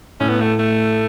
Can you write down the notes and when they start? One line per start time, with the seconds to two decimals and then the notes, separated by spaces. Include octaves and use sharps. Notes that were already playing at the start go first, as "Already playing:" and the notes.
0.20 A2 C#4
0.29 B3
0.40 A3
0.59 A3